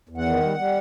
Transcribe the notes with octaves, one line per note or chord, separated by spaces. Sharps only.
E2
F#5
D#3
G3
G3